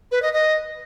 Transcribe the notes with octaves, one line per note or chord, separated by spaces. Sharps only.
B4
D#5
D#5